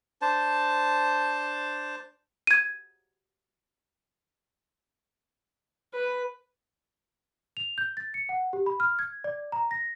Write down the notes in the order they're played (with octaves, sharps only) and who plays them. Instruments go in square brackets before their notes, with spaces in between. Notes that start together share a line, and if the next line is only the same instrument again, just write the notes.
[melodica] D4 C5 A5
[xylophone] G#6 D#7
[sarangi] B4
[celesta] F7
G6
A6
C#7
F#5
G4
B5
F6
G#6
D5
A#5
A#6